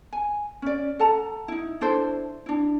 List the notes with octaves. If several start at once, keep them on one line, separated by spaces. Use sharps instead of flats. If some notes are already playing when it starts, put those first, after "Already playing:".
G#5
C#4 D5
A4 F#5 A5 A#5
D#4 E4
D4 E4 A4 C5
D4 E4